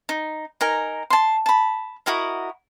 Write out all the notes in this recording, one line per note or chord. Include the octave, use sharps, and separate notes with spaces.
D#4
D#4 A#4 G#5
A5 C6
A5 B5
E4 F#4 A#4 D#5